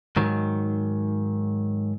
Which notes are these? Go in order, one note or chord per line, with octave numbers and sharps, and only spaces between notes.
G#2 D#3 F#3